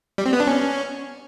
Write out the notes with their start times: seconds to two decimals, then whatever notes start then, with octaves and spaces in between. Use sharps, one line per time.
0.18 G3
0.25 C4
0.33 B3
0.40 D4
0.47 C#4